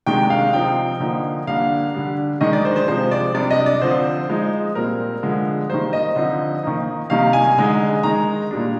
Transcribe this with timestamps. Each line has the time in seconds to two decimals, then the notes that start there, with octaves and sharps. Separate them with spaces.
0.07 C3 D#3 G#3 D4 G5
0.30 F5
0.53 C3 F3 C4 D#4 G5
1.00 D3 F3 A#3 D#4
1.47 D3 G3 A#3 D4 F5
1.94 D3 G3 D4
2.41 D#3 G#3 D4 D#5
2.53 D5
2.65 C5
2.76 C5
2.88 C3 F3 G#3 C5
3.11 D5
3.34 C3 G3 D4 D5
3.50 D#5
3.66 D5
3.82 D3 F3 C4 C5
4.29 F3 G#3 D#4
4.75 A#2 G3 C4 A#4
5.23 D3 F3 G#3
5.69 D#3 G3 A#3 C5
5.93 D#5
6.16 D3 F3 C4 D#4
6.63 D#3 A#3 D#4
7.10 C3 D#3 G3 A#3 D#4 F5
7.33 G#5
7.57 D3 G#3 D#4
8.03 D#3 G#3 D#4 A#5
8.51 A#2 G3 D4